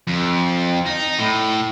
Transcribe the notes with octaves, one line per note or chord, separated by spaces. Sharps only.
F2
D#4
A2